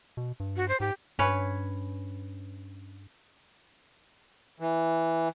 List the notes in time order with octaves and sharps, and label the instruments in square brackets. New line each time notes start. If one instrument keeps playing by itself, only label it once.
[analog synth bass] B2
G2
[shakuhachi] F#4
C5
[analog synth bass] G#2 [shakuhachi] G4
[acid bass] G2 [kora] C#4 B4 C#5
[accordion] E3